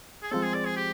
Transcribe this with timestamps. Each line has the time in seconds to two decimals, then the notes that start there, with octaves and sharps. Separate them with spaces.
0.22 G#4
0.31 F3 G#3 C4 A4
0.43 G#4
0.54 D5
0.65 G#4
0.76 G4